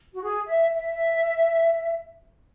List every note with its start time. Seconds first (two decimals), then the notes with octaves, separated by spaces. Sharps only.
0.13 F#4
0.23 G#4
0.46 E5
0.71 E5